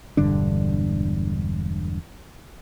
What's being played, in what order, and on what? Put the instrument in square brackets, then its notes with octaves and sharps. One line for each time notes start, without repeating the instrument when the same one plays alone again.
[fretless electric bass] E1 G2 D3 D4